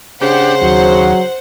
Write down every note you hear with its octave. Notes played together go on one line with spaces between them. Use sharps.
C#3 D4 G4 C5 F#5
D#2 F#3 F#4